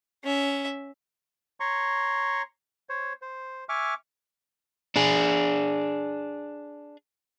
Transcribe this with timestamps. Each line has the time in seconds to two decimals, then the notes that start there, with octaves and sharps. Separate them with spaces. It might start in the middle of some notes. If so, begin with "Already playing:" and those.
0.23 C#4 E5
1.60 C#5 A#5 C6 C#6
2.89 C5 C#5
3.22 C5
3.69 E5 G#5 C#6 D6 F6
4.96 D4 G#4